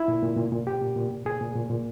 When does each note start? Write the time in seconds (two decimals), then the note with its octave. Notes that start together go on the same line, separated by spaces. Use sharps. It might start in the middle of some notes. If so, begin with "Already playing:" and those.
Already playing: E4
0.08 A#2
0.23 A#2
0.37 A#2
0.52 A#2
0.67 A#2 G4
0.81 A#2
0.96 A#2
1.11 A#2
1.26 A#2 G#4
1.41 A#2
1.56 A#2
1.70 A#2